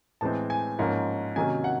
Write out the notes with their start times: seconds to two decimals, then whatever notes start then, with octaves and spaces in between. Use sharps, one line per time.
0.21 A2 E3 G#3 C4 A5
0.50 G#5
0.79 G#2 F3 A#3 C#4
1.36 C3 D#3 F#3 A#3 C#4 G#5
1.64 F#5